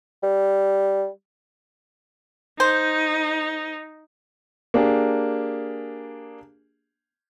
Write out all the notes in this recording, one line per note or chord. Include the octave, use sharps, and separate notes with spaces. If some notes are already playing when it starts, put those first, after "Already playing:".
G3
D#4 C5
A#3 D4 G4 G#4